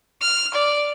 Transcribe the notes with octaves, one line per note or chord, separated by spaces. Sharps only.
F6
D5